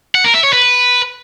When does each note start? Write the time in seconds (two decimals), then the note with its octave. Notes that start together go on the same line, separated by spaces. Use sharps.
0.15 F#5
0.24 A#4
0.34 E5
0.43 C#5
0.53 B4